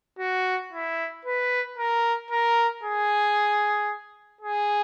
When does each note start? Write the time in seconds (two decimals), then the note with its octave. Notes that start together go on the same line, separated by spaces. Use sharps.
0.19 F#4
0.72 E4
1.25 B4
1.78 A#4
2.30 A#4
2.83 G#4
4.41 G#4